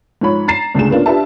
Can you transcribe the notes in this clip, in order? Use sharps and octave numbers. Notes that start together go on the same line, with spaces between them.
G#2 F3 C#5 B5
A#5 A6 C7 E7
C#2 D3 A3 G#4 E7
A#3 B3 C#4 D4 F4
D4 F4 G4 B4 E5 A5